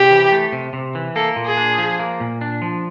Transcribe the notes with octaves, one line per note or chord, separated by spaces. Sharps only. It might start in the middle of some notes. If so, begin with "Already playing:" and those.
Already playing: C3 G4
E3
A3
C3
C3
E3
A#3 A4
A#2
G#4
D4
F3
A#3
A#2
D4
F3